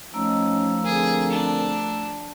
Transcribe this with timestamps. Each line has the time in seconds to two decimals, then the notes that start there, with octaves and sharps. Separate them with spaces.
0.14 F3 A3 C#4 D#4 A#5 E6
0.85 D3 C4 G#4 A#4
1.32 D4